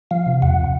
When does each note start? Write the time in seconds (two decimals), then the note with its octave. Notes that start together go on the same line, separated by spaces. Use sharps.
0.11 F3 F5
0.27 C3
0.42 E2 F#5